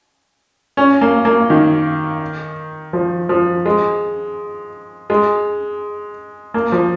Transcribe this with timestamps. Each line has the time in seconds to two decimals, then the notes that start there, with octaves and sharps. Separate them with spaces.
0.77 C#4
1.01 A#3
1.25 A#3
1.50 D#3
2.93 F3
3.29 F3
3.66 G#3
5.10 G#3
6.54 A#3
6.72 F3